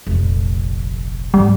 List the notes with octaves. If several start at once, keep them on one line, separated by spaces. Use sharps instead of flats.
F1 A#1
G#2 G3 A#3